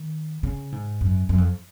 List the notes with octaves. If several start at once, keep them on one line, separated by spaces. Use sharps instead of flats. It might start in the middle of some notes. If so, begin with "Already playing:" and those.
Already playing: D#3
C#3
G#2
F#2
F#2
F2